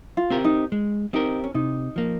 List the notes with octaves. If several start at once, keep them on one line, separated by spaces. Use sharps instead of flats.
F4
C4 G4 A#4
D#4
G#3
C4 D#4 G4 A#4
C#4
C3 D#4
F3 A#3